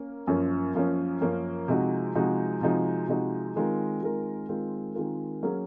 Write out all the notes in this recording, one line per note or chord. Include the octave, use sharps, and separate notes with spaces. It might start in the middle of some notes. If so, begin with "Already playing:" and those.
Already playing: A#3 C#4
F#2 F3 A#3 C#4
F#2 F3 A#3 C#4
F#2 F3 A#3 C#4
C3 F3 G#3 D#4 F#4
C3 F3 G#3 D#4 F#4
C3 F3 G#3 D#4 F#4
C3 F3 G#3 D#4 F#4
D#3 G#3 C4 F4 A#4
D#3 G#3 C4 F4 A#4
D#3 G#3 C4 F4 A#4
D#3 G#3 C4 F4 A#4
F#3 A#3 C#4 G#4